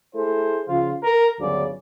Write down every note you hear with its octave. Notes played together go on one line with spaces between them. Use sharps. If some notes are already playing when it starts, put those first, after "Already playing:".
A3 E4 G#4 A4 C5
C#3 F3 F4
A#4
G1 D2 C#3 F#3 D5